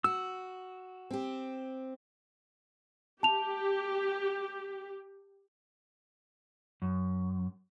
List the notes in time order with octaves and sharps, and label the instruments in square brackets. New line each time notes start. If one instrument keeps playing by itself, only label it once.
[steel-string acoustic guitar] F#4 [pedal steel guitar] E6
[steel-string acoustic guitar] C4 G4
[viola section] G4 [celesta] A5 F7
[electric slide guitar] F#2